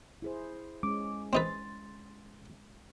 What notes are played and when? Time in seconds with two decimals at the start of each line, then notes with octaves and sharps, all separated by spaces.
0.22 E4 G#4 C5
0.83 G#3 C#4 D6
1.33 C4 D#4 B4 C6 A6